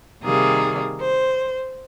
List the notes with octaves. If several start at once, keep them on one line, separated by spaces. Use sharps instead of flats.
C3 D#3 G3 A#3 G#4
C5